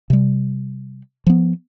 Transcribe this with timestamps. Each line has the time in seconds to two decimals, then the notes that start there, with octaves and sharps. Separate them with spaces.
0.10 C3 G3
1.27 F3 B3